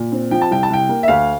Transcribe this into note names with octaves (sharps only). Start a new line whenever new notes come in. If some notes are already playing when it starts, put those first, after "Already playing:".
Already playing: A#2
C4
F3 G5
A5
C2 G5
A5
C2 G5
A#3
E5
D2 F5